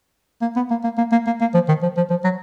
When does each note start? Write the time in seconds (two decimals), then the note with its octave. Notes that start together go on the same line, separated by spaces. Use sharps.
0.42 A#3
0.56 B3
0.70 A#3
0.84 A#3
0.98 A#3
1.12 A#3
1.26 A#3
1.41 A#3
1.54 F3
1.68 D#3
1.83 F3
1.97 F3
2.10 F3
2.24 F#3